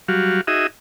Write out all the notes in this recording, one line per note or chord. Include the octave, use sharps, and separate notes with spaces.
F#3 G3 F#4 F5
D#4 F#4 G#4 D#5 E5